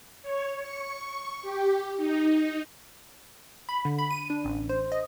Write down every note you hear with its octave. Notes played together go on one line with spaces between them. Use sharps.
C#5
C#6
G4
D#4
B5
D3
B5
D#7
D4
A1
C5
D#5